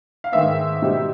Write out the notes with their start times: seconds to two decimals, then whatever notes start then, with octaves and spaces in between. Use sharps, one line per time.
0.24 F5
0.32 G#2 D#3 G#3 B3 E5
0.82 B2 G3 C4 D#4